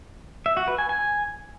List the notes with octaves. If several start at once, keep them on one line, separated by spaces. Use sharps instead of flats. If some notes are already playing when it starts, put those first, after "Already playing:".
E5
F#4
B4
G#5
G#5